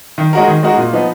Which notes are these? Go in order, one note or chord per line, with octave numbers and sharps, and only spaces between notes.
D#3
G#3 D#4 F#4 A#4
D#3
G#3 D#4 F#4 A#4
A#2
F3 B3 D#4